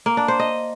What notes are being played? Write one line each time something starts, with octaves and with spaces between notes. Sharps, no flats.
A#3
D4
C5
D#5